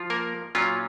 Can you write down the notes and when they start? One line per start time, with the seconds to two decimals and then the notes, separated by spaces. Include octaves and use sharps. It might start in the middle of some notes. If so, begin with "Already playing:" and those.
Already playing: F3 F4
0.10 A#3 A#4
0.55 A#2 F#3 C#4 F4